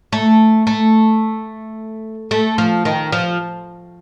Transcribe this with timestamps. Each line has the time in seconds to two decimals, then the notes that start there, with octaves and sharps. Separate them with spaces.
0.13 A3
0.67 A3
2.31 A3
2.58 F3
2.85 D#3
3.12 F3